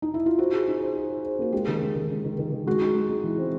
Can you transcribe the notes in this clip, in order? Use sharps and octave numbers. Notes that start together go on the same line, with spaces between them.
D#4
E4
F4
F#4 C5
G#4
D#4
C5
G#4
C5
C5
A#3 F#4
G#3 G4
D#3
G#3
D#3
G#3
D#3
D#3
D#3
G#3 F#4
D#4
G#3
G#3
E3
C4